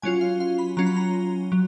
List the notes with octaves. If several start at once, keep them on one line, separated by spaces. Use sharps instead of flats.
F#3 C#4 F4 G#5
F5
F5
B5
F#3 C#4 F4 A#5
B5
A#5
F#3